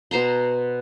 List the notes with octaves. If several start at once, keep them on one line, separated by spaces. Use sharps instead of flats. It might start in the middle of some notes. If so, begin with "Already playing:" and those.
B2 C5 A#5 C6